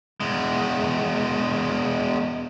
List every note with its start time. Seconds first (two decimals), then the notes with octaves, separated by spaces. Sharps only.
0.20 E2 G#3